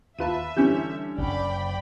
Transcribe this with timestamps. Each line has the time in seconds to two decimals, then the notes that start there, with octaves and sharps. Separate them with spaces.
0.19 D#2 F4 B4 E5 A5 D#7
0.57 D3 E3 G3 C#4 G6
1.18 F#1 D5 G5 B5